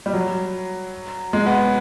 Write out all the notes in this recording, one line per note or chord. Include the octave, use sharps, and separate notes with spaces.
G3
F#3
G#3
B3